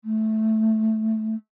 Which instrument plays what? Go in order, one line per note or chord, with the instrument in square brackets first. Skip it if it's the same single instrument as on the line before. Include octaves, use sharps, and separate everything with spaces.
[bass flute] A3